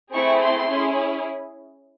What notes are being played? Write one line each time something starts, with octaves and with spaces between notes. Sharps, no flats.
A3 C4 E4 G#4 C#6
C6
C#4 E4 G#4